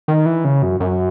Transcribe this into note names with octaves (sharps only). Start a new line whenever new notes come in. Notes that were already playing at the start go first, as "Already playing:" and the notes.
D#3
E3
C#3
F#2
F#2